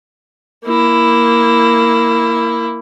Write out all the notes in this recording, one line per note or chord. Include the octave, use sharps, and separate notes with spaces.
A#3 E4